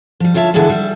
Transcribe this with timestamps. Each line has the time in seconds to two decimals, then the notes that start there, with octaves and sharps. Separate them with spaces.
0.20 F3 G3
0.34 D2 F4 C#5 E5 A5
0.54 D3 E3 B3 F4 G#4 A4
0.70 G3 E5